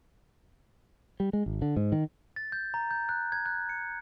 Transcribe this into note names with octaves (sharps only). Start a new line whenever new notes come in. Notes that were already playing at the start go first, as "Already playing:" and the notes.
G3
G#3
G#1
D3
G#2
D#3
A6
G6
A#5
G6
F#6
G#6
F#6
C#7